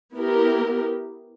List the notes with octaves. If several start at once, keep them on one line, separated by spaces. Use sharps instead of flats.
B3 E4 G4 A#4